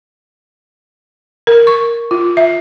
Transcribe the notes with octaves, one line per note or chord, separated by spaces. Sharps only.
A#4
C#6
F4
E5